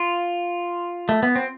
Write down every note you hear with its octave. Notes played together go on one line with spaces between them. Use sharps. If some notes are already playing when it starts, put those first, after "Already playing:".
Already playing: F4
A3
B3
C4